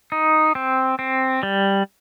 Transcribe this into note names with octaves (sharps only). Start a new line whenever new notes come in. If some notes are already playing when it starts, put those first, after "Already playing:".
D#4
C4
C4
G3